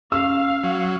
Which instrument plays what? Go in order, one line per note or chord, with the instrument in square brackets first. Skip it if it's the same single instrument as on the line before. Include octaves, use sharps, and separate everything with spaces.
[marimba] C#4 [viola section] F5 [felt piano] E6
[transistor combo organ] F#3